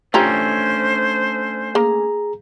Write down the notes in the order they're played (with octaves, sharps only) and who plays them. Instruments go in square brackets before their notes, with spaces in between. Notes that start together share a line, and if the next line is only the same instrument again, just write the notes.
[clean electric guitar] A3 C#4 D4 [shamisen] F4 G4 A#5 [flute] C5
[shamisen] A#3 [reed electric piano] G#4 A#5